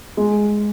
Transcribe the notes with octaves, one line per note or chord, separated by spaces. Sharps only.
G#3